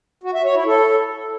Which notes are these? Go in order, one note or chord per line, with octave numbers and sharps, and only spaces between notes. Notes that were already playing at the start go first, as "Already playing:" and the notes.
F#4
E5
C#5
E4
A4